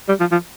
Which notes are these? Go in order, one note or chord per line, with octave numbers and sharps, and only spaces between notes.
G3
F3
F3